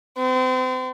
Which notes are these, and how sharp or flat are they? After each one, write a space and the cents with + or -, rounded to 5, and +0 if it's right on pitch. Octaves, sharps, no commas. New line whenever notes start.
C4 -35